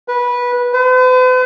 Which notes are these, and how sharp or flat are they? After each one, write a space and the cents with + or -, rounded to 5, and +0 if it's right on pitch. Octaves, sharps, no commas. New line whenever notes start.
B4 -15
B4 +45